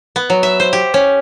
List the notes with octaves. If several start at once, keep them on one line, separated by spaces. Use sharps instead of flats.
B3
F#3
E5
C5
G4
C#4